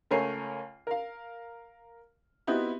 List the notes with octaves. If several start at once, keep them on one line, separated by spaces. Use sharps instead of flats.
C#2 A3 A#4 C#5 G#5 C7
A#4 F5
B3 C4 D#4 E4 F#4 G4